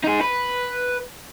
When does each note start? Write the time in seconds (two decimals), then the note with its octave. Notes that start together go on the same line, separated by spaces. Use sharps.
0.04 D#4 G#4
0.21 B4